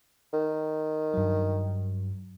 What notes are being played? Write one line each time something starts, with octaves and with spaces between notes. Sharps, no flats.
D#3
G2 F#3